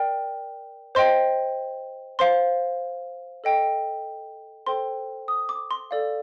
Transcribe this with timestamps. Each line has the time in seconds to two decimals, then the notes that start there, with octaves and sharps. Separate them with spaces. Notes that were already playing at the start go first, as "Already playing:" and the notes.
Already playing: A#4 D5 G5
0.95 C5 D#5 G5 C6
2.19 C5 F5 C6
3.44 A4 D#5 G5
4.66 A4 C5 G5 C6
5.28 D#6
5.49 D6
5.71 C6
5.91 A4 D5 F5